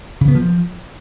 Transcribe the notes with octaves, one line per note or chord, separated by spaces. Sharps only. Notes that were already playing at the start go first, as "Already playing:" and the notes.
C#3
B3
F3